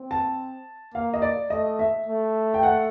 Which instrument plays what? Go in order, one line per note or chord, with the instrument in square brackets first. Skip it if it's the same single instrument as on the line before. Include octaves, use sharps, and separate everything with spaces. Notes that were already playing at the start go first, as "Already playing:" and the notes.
Already playing: [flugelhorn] C4
[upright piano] A5
[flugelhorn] A#3 [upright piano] F5
[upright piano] D#5
D5
[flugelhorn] A3 [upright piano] D#5
[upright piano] E5
[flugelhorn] A3
[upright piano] G5
F#5